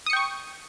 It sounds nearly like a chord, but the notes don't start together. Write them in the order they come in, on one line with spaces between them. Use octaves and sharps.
D#6 C#7 G5 C#6